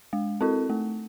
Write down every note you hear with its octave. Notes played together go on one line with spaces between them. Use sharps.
G#3
C4 E4 A4
A3